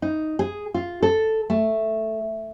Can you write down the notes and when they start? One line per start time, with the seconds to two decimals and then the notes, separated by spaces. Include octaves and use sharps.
0.02 D#4
0.39 G#4
0.74 F4
1.03 A4
1.50 A3